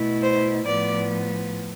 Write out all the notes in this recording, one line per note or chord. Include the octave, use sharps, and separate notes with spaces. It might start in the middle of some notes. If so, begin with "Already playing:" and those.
Already playing: B2 A3 E4
C5
A2 F3 B3 D5